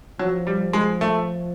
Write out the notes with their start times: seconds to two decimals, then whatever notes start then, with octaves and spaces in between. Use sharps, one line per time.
0.19 F3 F#3
0.47 G3
0.73 G#3
1.01 A3